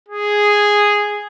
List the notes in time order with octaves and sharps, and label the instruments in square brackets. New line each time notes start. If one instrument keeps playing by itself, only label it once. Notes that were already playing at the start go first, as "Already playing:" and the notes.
[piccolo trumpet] G#4